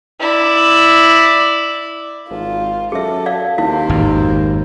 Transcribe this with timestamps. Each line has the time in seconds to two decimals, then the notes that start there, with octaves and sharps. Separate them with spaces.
0.20 E4 D5
2.30 G#1 F4
2.92 F#2 G#4 A4 E5
3.26 D5 F5
3.58 D#2 A#3 E4 C5 F5
3.90 G#1 F2